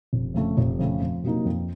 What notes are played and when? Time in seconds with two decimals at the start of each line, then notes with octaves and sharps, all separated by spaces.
0.13 F1
0.34 F2 C#3 A3
0.57 F1
0.79 F2 C#3 A3
1.01 F2
1.23 C3 F#3 A#3 D#4
1.45 F2